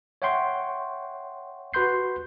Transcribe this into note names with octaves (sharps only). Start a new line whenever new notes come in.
C#5 E5 F#5 G5 C6 C#6
F#4 B4 B5 C6 G6 C7